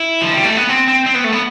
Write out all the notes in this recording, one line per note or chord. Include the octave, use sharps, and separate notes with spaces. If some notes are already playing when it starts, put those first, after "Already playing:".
Already playing: E4
F3
G3
A3
B3
C4
C4
C4
B3
A3
B3